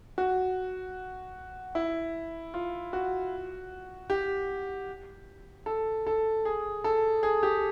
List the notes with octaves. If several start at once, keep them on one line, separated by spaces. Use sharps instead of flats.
F#4
E4
F4
F#4
G4
A4
A4
G#4
A4
G#4
G4